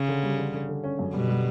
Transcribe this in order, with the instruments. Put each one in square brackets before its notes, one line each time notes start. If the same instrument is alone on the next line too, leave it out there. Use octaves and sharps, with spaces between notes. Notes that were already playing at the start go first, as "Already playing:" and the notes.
Already playing: [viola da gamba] C#3 [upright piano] C#4
[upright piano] D3
G3
D3
D3
D3
C#4
F#2
[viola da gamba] B2 [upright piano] G3
[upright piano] G3